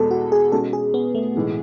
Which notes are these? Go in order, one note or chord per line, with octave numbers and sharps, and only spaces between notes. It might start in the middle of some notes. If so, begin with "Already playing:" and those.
Already playing: E2 B2 G#3 B3 A4
F#4
G#4
B2 G#3 C#4 F#4 A4
G#4
B3
A3
B1 A2 E3 G#3